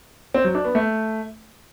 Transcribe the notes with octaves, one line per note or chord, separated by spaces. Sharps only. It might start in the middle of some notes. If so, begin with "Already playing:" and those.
C4
F#3
D4
B3
A3